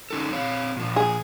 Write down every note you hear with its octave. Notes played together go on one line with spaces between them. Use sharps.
C#4 D#4 A4
C4 C#5 F5
A#2 F3
G#4